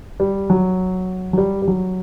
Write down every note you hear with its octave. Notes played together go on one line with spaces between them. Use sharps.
G3
F#3
F#3
G3
G3
F#3